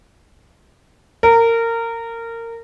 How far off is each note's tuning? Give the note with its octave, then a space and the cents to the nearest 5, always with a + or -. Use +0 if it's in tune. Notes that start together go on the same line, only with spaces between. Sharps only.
A#4 -20